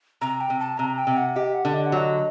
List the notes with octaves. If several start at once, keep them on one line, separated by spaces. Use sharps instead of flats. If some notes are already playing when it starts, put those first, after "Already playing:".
C3 A#5
G5
C3
A5
C3 A#5
G5
C3
F#5
G4 D#5
F#5
D3
D#5
F#5
F#3
D#5